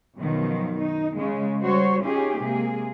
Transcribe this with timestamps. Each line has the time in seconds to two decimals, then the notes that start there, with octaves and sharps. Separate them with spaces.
0.17 F#2 B2 D#3 F3
0.79 D#4
1.16 C#3 G#3
1.63 G3 F#4 C5 C#5
2.02 C#4 D#4 F4 G4 G#4
2.38 C3 G#3 A#3 G#4